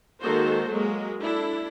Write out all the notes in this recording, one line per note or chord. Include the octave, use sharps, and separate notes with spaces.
D#3 G#3 A#3 F#4 A4 C5
F#3 G#3 A#3
D4 E4 A4